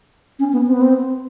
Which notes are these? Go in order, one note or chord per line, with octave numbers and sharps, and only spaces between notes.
C#4
B3
C4
B3
C4